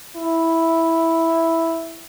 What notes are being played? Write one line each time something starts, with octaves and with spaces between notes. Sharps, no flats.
E4